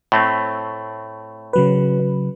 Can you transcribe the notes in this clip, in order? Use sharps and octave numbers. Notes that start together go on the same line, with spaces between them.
A2 A3 C4
C#3 F#3 B4